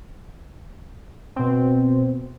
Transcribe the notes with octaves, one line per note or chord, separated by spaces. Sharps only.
B2 C4